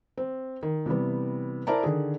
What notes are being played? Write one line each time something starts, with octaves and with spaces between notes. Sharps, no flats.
C4
D#3
C3 E3 G3 B3
E4 A#4 C5 D5 A5 A#5
D3 D#3 G#4